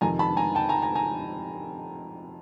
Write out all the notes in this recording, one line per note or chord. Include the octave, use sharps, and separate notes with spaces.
F2 C3 D#3 G#5 A#5
A5 B5
G#5 A#5
G5 A5
G#5 A#5
G#5 A#5
G#5 A#5